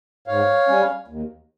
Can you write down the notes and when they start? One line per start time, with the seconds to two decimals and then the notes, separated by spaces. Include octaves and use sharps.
0.27 G#2 C#5 F5
0.68 G3 C#4
1.08 D#2